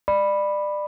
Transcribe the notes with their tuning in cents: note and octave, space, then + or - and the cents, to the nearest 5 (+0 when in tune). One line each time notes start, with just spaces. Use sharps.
D5 +25 B5 +0